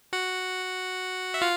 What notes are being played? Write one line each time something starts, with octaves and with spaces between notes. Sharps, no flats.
F#4 F#5
E5
F4 F5